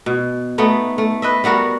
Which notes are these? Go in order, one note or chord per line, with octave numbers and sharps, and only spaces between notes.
B2
A3 B3 D#4
A3
B4 D#5 E5
G3 B3 F#4 A#4